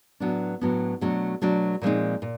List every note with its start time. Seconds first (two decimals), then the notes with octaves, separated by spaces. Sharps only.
0.20 A2 F#3 B3 D4
0.61 A2 F#3 B3 D4
1.01 B2 F#3 A3 D4
1.42 B2 F#3 A3 D4
1.82 A#2 F3 G#3 C4 D#4
2.22 A#2